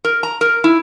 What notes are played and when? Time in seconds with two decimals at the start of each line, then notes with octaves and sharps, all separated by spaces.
0.05 A#4
0.23 A#5
0.41 A#4
0.64 E4